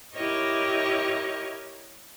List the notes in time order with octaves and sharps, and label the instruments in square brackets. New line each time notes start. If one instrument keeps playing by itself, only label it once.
[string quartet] E4 G4 A#4 C#5 D#5